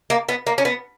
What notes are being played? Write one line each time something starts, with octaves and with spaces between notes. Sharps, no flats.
A#3
B3
A#3
C#4
B3